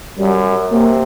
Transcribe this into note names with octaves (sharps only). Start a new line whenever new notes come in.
F#2 G3
C3 A#3